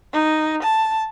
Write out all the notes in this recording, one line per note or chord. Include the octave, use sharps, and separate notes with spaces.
D#4
A5